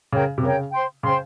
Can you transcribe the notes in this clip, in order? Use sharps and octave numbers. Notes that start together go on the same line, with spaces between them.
C#3 A#4 C#5 G5
C3
C#3 A#4 C#5 G5
C5 G5 C6
C#3 C5 G5 C6